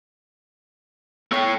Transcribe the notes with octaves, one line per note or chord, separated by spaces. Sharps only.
A3 B3 C#5 G5